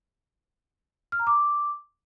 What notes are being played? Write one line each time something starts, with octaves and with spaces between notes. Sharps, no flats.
F6
A#5
D6